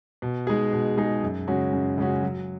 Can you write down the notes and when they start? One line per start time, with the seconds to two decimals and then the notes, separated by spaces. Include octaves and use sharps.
0.22 B2
0.47 G#3 D#4 G#4
0.73 B2
0.97 G#3 D#4 G#4
1.23 F#2
1.48 C#3 G#3 C#4 F#4
1.73 F#2
1.98 C#3 G#3 C#4 F#4
2.23 F#3